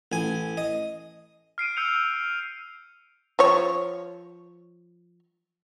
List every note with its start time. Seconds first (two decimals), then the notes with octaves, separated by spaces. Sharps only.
0.12 A1 G#5
0.57 D#5
1.58 F6 C7 D7 D#7
1.77 E6 G6 C#7 F7
3.39 F3 C#5